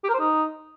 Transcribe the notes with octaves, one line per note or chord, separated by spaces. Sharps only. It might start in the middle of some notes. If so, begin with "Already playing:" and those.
G4
A#4
C5
D#4